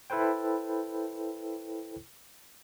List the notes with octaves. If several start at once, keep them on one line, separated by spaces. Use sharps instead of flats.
E4 A4 B4 C5 G5